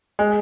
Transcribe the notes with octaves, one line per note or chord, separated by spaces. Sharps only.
G#3